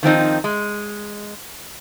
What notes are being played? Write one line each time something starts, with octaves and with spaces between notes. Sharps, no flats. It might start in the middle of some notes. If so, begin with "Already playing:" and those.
D#3 F3 C4 D#4
G#3